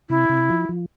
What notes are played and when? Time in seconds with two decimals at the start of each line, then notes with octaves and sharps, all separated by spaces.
0.09 C3 E4
0.29 C3
0.50 F3
0.69 F3